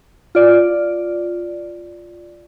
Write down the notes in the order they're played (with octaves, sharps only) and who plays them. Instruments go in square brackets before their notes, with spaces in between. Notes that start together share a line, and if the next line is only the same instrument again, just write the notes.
[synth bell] F4 D5